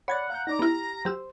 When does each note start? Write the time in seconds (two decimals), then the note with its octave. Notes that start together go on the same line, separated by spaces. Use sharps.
0.08 C#5 D5 F#5 B5 G#6 A6
0.30 F5 A#5 F#6 G6
0.47 D#4 D5 A#5 D6 A#6
0.59 B3 E4 G4 F6
1.05 F#3 G4 C5 E6